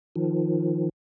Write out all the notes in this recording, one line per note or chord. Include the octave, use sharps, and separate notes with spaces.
D#3 F3